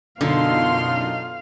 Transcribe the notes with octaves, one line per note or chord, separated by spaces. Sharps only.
F#2 B2 D3 D#4 F4 F5 C6